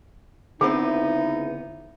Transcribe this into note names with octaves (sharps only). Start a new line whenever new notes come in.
C#2 D3 B3 C4 D#4 E4 G#4